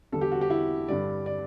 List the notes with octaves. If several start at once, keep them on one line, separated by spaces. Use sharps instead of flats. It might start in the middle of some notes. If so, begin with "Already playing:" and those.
E2 D3 G3 A4
G4
F#4
G4
E4
G2 D3 G3 D5
D5